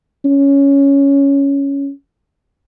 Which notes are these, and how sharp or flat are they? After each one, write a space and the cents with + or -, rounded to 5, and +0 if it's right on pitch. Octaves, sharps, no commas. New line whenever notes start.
C#4 +5